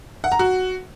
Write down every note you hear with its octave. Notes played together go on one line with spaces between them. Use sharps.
F#5
A#5
F#4